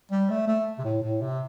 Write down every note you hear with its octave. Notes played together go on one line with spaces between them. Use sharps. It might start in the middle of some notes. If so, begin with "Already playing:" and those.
G3
A3
A3
C3
A2
A2
C3